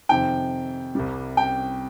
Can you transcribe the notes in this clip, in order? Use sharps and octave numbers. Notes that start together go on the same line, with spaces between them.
F2 C3 D#3 G5
C2 C3 G3
G5